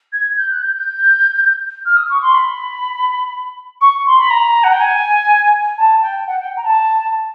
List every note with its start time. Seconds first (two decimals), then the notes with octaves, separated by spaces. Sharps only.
0.12 G#6
0.36 G6
0.50 F#6
0.62 G6
0.74 G6
1.85 F6
1.96 D#6
2.09 C#6
2.22 C6
2.34 B5
3.80 C#6
4.06 C6
4.18 B5
4.30 A#5
4.63 F#5
4.71 G5
4.80 G#5
5.77 A5
6.01 G5
6.26 F#5
6.39 G5
6.56 A#5
6.64 A5